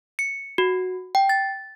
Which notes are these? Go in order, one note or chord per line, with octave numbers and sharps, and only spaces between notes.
C#7
F#4
G5
A6